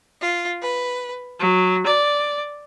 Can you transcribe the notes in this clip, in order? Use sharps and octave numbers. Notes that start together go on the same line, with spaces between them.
F4
B4
F#3
D5